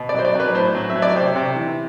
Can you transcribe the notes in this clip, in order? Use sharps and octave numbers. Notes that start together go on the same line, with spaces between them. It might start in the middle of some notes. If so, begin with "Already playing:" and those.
Already playing: B2
D5
F#3 C5
D5
F#3 B4
A2 C5
F#3
E5
F#3
D5
C3 C5
C3
E3